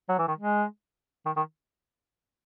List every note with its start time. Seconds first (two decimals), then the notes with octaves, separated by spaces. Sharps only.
0.09 F#3
0.18 E3
0.28 D#3
0.38 G#3
1.26 D#3
1.36 D#3